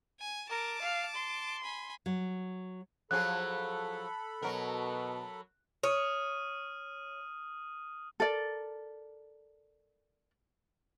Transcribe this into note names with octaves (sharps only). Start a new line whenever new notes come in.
G#5
A#4 A5 D6
F5
C6
G#5 B5
F#3
F3 F#3 G#4 A4 B5 F#6
B2 F#3 A#4
C#5 D#6 F6 D#7
A4 A#4 D5